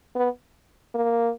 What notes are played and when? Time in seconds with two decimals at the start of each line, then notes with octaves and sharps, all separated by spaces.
0.16 B3
0.95 A#3